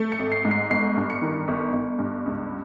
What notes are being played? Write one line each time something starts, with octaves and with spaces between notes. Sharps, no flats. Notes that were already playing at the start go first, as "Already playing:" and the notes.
Already playing: A3
C#7
G#1
C7
G#2
C7
G1 C7
G2
C#7
D#3
G1
G1
G2
C#2